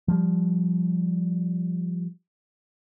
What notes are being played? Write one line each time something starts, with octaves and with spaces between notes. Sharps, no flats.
F3 G3